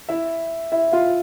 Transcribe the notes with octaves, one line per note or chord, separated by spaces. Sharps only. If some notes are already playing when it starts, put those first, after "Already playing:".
E4 E5
E4 E5
F4 F5